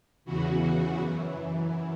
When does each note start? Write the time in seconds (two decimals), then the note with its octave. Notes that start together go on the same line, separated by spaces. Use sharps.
0.25 E2 C#3 E3 F#4
0.98 F#2 E3